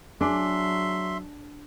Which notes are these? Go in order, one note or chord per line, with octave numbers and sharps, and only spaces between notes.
F#3 D4 G#4 E5 G#5 C6 D6